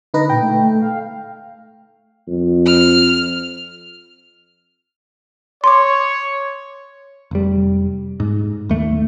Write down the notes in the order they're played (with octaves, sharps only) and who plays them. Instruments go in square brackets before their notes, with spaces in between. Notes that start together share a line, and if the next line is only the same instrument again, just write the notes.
[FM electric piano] D3 D#4 B4 [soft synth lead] A#6
[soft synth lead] A#2 [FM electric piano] G5
[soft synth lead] A3
F5
[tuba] F2
[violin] F6
[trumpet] C#5 [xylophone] C6 D6
[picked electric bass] F1 G3
G#2
D#2 A3